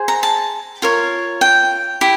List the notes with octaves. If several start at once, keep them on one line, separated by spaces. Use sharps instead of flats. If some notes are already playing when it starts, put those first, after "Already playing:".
Already playing: G#4 C5
A#5
A5
F4 A#4 C#5
G5
E4 G4